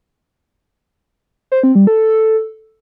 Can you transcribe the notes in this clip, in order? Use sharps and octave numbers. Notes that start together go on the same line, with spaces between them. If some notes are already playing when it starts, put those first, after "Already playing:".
C5
C4
G3
A4